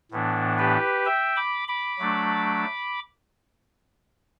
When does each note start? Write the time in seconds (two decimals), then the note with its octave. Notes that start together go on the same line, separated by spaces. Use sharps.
0.12 A2 E3 B3 D4
0.58 G4 B4
1.05 E5 G5
1.36 B5 D6
1.68 B5 D6
1.99 F#3 A3 D4